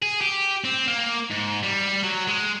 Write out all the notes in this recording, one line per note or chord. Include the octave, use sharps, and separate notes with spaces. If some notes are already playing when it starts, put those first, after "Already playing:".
G#4
G4
C4
A#3
G#2
G3
F#3
G#3